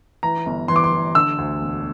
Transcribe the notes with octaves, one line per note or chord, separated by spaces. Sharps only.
E3 A#5
G1
E3 C6
D6
C6
E3
D3 E6
D2
E1